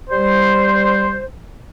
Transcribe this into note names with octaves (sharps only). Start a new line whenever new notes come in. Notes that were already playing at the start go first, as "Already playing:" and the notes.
G3 C5